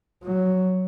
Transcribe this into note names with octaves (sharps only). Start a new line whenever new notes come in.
F#3